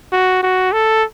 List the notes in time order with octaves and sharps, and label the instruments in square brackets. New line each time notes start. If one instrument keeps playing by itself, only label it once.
[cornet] F#4
F#4
A4